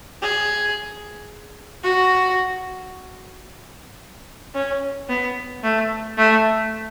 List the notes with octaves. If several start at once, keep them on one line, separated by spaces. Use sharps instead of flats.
G#4
F#4
C#4
B3
A3
A3